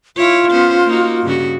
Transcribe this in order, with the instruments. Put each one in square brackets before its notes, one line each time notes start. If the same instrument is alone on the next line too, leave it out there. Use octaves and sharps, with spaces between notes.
[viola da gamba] E4 C#5 [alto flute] F4
[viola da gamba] B3 C#4 C5
A#3 D#4 F#4
G2 C#3 F#4